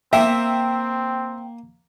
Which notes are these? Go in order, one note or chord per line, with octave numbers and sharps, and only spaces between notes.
A#3 C4 A#4 E5 G5